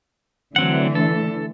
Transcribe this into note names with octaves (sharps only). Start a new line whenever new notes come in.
D3 E3 F#3 A3 C4 F#5
A4